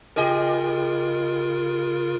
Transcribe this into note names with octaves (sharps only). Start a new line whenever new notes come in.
C#3 F4 G4 G#4 A#4 D#5